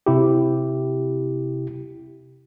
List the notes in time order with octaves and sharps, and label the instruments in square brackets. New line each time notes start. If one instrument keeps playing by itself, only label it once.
[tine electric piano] C3 E4 G4